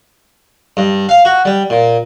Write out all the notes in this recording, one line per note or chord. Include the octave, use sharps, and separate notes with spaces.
G2
F5
F#4
G3
A#2